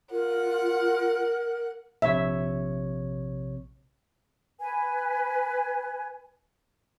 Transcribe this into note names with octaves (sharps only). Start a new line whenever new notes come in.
F4 A#4 F#5
A#1 C3 C#5 E5
B4 G#5